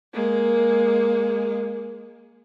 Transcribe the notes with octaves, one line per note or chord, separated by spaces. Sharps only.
G#3 A#3